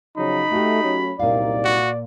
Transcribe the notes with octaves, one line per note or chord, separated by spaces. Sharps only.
C#3 F3 F#3 D#4 B5
A3 F#4 G4
F#3 A3 C#4
C2 F#2 A#2 D#4 D5 F5
F#4